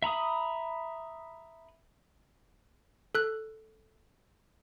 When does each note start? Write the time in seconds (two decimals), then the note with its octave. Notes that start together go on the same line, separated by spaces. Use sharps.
0.02 E5 A#5 B5 D#6
3.15 A4 F#6